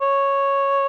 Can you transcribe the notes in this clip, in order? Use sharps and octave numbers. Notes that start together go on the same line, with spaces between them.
C#5